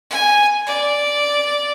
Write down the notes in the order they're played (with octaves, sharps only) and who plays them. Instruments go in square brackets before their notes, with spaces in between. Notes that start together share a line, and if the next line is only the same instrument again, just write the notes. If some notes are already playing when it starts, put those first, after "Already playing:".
[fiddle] G#5
D5